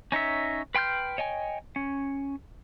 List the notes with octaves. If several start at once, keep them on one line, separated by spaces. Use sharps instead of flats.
C#4 D#4 C#5 E5
B4 G5 C6 F6 G6
C#5 D#5 G5 G#5
C#4